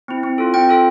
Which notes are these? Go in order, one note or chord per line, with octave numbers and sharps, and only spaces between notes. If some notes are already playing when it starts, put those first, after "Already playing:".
C4 E4
C4
F4 A4
C4 G5
F4 A4